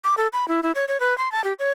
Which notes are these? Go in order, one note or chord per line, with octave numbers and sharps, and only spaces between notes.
D6
A4
B5
E4
E4
C#5
C#5
B4
C6
A5
G4
C#5